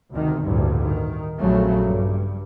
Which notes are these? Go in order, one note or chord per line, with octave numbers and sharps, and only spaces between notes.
D2 C3 D#3
A1 D2 G2 A#2
D#3
A#1 F2 C#3 F#3 A3
G2